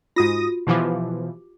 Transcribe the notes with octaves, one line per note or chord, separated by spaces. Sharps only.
G#2 F4 F#4 D#6 A#6
B2 E3 F3 G4 D6